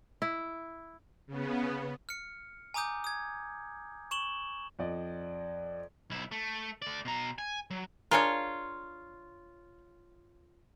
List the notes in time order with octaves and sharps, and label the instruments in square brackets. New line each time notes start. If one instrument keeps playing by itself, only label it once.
[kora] E4
[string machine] C#3 B3
[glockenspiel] F6 C#7
G#5 A#5 D6 D#6 G6
D#6 G#6
C#6 E7 F#7 G7
[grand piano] F2 D5 D#5
[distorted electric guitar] B1 E4
A3
A3 D5
B2 A#5
G#5
F#3
[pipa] D4 G#4 A#4 [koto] F4 C#5